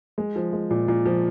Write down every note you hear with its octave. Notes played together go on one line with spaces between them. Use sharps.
G#3
F3
G#3
A#2
A#2
F3